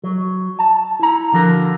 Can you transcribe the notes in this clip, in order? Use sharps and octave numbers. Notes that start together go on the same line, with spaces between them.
F#3
A5
E4 A#5
D3 F3 F#4 A#4